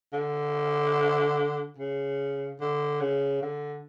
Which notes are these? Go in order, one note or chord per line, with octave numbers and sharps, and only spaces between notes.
D3
C#3
D3
C#3
D3